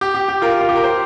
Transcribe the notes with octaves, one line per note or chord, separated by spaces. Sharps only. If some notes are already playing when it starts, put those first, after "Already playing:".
G4
G4
G4
F4 A#4
F4
G4
A#4
G4 C5